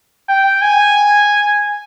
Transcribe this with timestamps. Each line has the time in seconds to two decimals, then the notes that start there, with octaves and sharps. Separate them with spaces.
0.29 G5
0.62 G#5